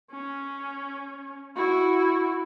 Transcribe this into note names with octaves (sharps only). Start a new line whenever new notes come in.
C#4
E4 F#4